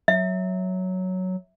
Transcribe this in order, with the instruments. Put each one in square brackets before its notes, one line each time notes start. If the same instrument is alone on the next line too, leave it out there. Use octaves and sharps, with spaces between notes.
[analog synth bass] F#3 [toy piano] E5